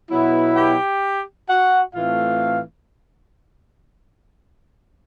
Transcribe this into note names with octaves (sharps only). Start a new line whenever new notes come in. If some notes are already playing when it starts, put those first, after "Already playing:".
B2 F#3 B3 E4
G4 G5
F#4 F#5
A2 E3 A3 C4 F4 F5